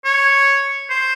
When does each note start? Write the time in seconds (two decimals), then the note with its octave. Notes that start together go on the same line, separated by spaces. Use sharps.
0.05 C#5
0.90 C5